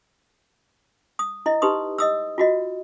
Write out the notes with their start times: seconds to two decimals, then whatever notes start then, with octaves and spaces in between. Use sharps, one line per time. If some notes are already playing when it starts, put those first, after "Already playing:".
1.19 D#6
1.46 E4 D#5
1.62 D#4 G4 B4 C6 D#6
1.98 D#5 D#6 E6
2.38 F4 F#4 D#5